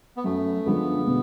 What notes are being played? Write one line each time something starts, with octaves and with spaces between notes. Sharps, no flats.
B3
F#2 A3
D3 F3 G#3 B3
B2